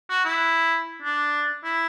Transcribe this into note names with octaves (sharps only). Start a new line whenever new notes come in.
F#4
E4
D4
E4